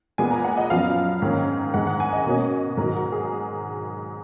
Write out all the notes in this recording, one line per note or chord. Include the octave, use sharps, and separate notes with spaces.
A#2 G#3 B3 G#5
A#5
F#5
D#5
F#2 F3 B3 F5
G#2 D#3 A#3 C#4
G#2 D#3 G#3 F#5
F#5
G#5
D#5
B2 A#3 C#4
G#2 D#3 F#3 A#4
F#4
G#4